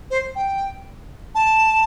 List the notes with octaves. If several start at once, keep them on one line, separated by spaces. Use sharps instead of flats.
C5
G5
A5